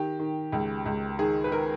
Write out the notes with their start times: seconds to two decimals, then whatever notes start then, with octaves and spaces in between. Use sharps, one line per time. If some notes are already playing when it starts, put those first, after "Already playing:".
Already playing: D#3 G4
0.19 D#3
0.52 C#2
0.86 C#2
1.19 D#3 G#4
1.44 B4
1.52 D#3 A#4